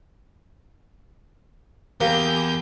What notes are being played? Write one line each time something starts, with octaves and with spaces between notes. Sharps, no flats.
E2 A#3 G4 G6